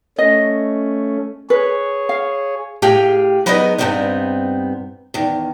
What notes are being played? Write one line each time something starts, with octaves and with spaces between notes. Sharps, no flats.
A3 C#4 D#5
G#4 B4 C#5
F5
A2 G4 G#4 F5 G5 G#5
F#3 G#3 B3 D#4 B4 D#5
G2 C3 G#3 B3 C4 D#4
E2 D#3